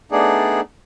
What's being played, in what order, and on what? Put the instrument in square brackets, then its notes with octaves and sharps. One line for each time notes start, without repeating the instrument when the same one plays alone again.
[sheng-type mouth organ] A3 B3 D4 D#4 G#4 D5